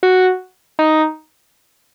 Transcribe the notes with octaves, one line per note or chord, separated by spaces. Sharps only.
F#4
D#4